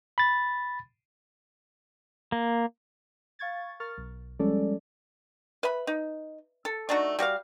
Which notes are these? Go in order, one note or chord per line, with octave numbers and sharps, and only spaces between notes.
B5 A6
A#3
F5 C#6 G#6 A6
A#4 C#6 F6 A6
B1
F3 G3 G#3 C#4 A4 D5
B4 E5 B5
D#4
A4
A3 D4 D#4 F#4
G3 F#4 A#4 F5